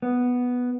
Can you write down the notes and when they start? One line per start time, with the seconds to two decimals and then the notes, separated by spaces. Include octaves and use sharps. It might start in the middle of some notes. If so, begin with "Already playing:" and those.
0.02 B3